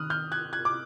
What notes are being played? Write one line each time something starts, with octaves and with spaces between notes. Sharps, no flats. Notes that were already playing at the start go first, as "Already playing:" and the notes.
Already playing: D#3 D#6 F6 F#6
F6 G6
F#6 G#6
F#6 G#6
D6